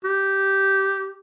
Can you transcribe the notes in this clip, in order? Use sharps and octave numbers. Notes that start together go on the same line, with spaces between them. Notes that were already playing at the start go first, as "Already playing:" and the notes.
G4